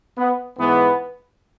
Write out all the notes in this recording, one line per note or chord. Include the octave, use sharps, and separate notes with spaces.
B3
G#2 E3 B3